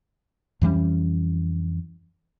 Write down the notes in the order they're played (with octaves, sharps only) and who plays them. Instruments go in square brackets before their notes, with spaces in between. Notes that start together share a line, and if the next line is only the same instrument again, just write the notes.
[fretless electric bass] F2 E3 G3 C#4